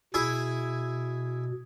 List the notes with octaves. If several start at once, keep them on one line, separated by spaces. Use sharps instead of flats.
B2 E4 G#4